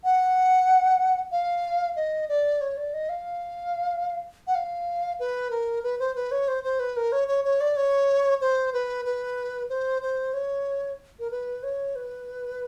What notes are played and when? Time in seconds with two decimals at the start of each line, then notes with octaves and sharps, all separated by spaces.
0.04 F#5
1.32 F5
1.96 D#5
2.29 D5
2.61 C#5
2.77 D5
2.94 D#5
3.09 F5
4.47 F#5
4.55 F5
5.19 B4
5.51 A#4
5.83 B4
5.99 C5
6.15 B4
6.31 C#5
6.48 C5
6.63 C5
6.79 B4
6.96 A#4
7.12 C#5
7.28 C#5
7.44 C#5
7.60 D5
7.76 C#5
8.41 C5
8.73 B4
9.05 B4
9.69 C5
10.02 C5
10.34 C#5
11.19 A#4
11.31 B4
11.63 C#5
11.95 B4